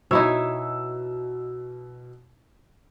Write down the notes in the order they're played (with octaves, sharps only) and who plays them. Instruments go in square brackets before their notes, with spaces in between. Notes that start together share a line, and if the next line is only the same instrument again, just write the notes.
[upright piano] B2 E6 [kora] D#4 E4 C#5